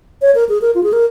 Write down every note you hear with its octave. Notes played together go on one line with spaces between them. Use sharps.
C#5
A#4
G#4
A#4
F4
G#4
A#4